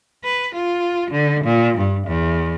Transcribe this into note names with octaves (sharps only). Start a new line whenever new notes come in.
B4
F4
D3
A#2
G2
E2